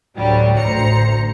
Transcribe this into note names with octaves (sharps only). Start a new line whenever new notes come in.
A1 D2 F#3 G3
A1 D2 C5 A#5 C#7